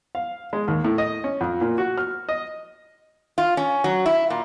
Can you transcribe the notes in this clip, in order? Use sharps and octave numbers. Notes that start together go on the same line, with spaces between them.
F5
G#3
D#2
A2
D#5
C#4
F2
A#2
F#4
F6
D#5
F4
C#4
F#3
E4
A#2